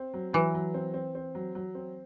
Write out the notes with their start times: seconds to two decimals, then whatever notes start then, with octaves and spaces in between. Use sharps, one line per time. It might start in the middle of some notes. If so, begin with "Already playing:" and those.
Already playing: C4
0.14 F#3
0.33 E3 F#3
0.54 F#3
0.74 C4
0.94 C4
1.15 C4
1.35 F#3
1.55 F#3
1.75 C4